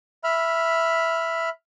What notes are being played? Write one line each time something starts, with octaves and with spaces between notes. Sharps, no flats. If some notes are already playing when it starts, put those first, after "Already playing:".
E5 B5 F6